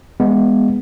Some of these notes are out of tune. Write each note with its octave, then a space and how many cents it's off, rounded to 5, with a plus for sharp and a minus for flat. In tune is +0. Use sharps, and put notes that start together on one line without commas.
G#3 -10 B3 +0